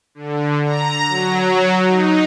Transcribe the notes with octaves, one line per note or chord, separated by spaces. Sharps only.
D3
A#5
F#3
D#4